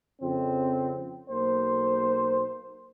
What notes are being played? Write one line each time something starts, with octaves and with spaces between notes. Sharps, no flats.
F2 C#3 C4
B1 A#3 C5